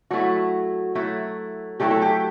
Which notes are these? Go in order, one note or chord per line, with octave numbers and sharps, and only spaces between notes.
F#3 A3 E4 F#4
F#3 A3 E4
F#3 A3 E4 G4
A4
G4